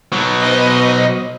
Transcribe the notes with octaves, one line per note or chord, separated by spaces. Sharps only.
B2 F#3
B4 C5 D#5